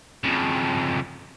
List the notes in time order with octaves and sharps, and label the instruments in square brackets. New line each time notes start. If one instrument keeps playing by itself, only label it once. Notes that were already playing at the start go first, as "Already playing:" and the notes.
[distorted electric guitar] F2 C#3